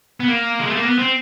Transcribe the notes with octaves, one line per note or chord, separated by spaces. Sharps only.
B3
A#3
G#3
A3
A#3
B3
C4